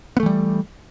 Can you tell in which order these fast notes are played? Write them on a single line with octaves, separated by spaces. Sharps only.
B3 A3 E3 G3